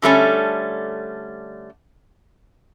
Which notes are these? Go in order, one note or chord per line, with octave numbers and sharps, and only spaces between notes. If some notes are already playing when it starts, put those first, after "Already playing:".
D3 G3 A3 C#4